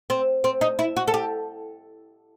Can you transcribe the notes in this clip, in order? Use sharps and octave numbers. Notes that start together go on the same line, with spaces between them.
C4
C4
D#4
E4
F#4
A4
G4